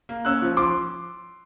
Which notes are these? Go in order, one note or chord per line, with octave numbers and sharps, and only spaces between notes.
A#3
C#4 E6 F#6
F3
F3 C6 D6